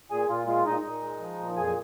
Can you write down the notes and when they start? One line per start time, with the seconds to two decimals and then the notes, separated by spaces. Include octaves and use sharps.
0.11 A#2 G#4 G#5
0.29 A#2 F4
0.47 G#3 F4
0.66 A#2 D#4 D#5
0.84 A#2
1.02 G#3
1.20 F3
1.39 A#2
1.56 F2 G#4 G#5